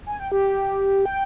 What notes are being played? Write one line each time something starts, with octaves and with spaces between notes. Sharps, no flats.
G#5
G5
G4
G5